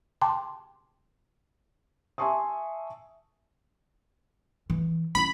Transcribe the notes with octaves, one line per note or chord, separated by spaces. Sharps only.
G5 A5 C6 D6
E5 G#5 A5 C6 C#6 D#6
E3
C#4 E4 B5